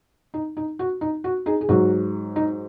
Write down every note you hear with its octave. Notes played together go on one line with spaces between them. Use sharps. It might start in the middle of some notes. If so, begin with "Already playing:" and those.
D#4
D#4
F#4
D#4
F#4
D#4 G#4
G#4
G#2 F#3 F#4
D#4